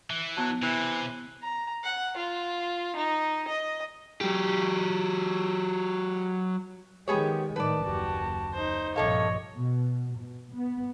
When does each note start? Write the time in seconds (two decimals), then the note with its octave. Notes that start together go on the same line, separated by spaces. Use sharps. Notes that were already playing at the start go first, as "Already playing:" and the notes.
0.10 E3
0.37 F#3 B3 A5
0.62 C3 E3
1.42 A#5
1.84 F#5
2.17 F4
2.96 D#4
3.48 D#5
4.21 F#3 G4
7.08 D#3 G#3 B3 G4 G#4 C#5
7.56 A2 D#3 B4 D5 A5
7.85 F#1 D#2 F#4 G4
8.54 D#4 C5
8.96 A#1 G2 C3 A4 C#5 D#5 F5
9.57 B2
10.17 B2
10.54 B3